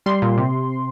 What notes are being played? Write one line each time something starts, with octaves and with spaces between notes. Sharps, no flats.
G3 C6
A#2
C3